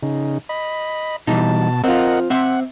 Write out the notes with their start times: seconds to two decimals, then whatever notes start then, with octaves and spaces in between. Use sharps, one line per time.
0.03 C#3 D#4
0.49 D#5 B5
1.27 B2 E3 G3 D#4 A5
1.84 C4 F4 A#4 D#5 F#5
2.30 C4 E5 F#5